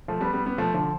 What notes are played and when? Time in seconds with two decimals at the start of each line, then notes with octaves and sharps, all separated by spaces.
0.08 F3 A3
0.21 G3 B3
0.33 G3 B3
0.46 G3 B3
0.58 F3 A3
0.74 D3 F3